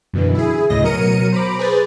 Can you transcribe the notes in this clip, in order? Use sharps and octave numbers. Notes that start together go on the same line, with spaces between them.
F#2 B2 D3 E3
E4 G#4
D2 A2 C#3 D#5 A#6
B2 F#3 A#4 C#7 D#7
C5 A#5 B5 D6
G#4 B4 C5 A6